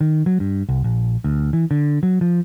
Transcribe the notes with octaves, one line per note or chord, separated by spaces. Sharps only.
D#3
F#3
G2
C2
A#1
D2
E3
D3
F#3
F3